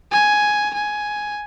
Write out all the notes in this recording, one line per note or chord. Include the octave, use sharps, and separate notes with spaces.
G#5
G#5